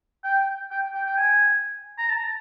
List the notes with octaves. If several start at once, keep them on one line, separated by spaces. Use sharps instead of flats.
G5
G5
G5
G5
G#5
A#5
A5